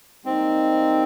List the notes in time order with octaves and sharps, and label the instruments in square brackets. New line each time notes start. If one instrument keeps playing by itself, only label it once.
[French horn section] G#2 G3 A#3 D#4 [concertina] C4